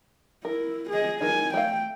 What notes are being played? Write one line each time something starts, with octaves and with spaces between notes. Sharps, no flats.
E4 A#4
G#4 D#5
D#3 E3 D#4 G#5
A3 F5 G5